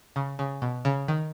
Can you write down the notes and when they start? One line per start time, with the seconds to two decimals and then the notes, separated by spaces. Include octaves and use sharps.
0.16 C#3
0.39 C#3
0.62 B2
0.85 C#3
1.08 D#3